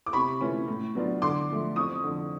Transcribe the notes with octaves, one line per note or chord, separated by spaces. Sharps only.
D6
C3 B5 C#6
E3 A3 C#4 F4
A2
F#3 B3 D4 F4
D3 C6 D6
F3 A3
F2 C#6 D#6
D3 F3